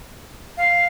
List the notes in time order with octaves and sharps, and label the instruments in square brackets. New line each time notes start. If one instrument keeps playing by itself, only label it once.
[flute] F5